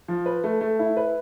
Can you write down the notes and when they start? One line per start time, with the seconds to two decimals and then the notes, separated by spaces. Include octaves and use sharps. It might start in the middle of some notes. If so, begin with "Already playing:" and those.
0.08 F3
0.26 B4
0.44 A3
0.61 A3
0.79 E4
0.97 B4